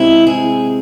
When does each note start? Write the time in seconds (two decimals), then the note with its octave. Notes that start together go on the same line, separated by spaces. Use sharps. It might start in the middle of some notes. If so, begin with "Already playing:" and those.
Already playing: C3 G#3 C4 E4
0.27 G#4